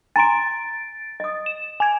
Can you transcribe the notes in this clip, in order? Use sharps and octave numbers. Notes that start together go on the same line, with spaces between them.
G#5 A#5 C6 A6 D7
D#5 D#6
E7
G#5 G#6